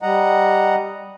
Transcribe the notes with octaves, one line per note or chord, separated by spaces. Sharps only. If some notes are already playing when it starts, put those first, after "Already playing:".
G3 D#5 F#5 A#5